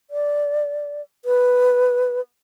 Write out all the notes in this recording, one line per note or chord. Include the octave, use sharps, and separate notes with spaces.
D5
B4